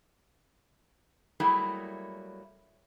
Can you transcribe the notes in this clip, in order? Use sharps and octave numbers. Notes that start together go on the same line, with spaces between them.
F#3 G3 A3 A#3 E4 G#4